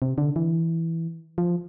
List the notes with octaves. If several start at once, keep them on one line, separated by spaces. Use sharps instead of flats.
C3
D3
E3
F3